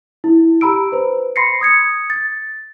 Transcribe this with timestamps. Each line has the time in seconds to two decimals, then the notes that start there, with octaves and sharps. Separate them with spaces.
0.24 E4
0.61 G4 A#5 B5 E6 D7
0.92 B4 C5
1.36 B5 C6 A#6 C7 C#7
1.61 D#6 G#6 C#7
2.10 A6